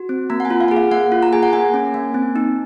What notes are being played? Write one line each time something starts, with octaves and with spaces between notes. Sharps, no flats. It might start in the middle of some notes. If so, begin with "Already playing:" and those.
Already playing: F#4
C4
A#3 A#5
F#5
G#5
F4
F5
F#5
G#4
F5
A#3 F#5
F4
A#5
G#4 G#5
F#5
A#3 G#5
C#4
A#3
C4
D#4